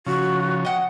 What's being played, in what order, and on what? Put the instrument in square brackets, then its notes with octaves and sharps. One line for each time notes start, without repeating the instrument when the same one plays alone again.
[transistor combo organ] C#3 F3 [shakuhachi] F#4
[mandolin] D#5 F#5 [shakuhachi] G5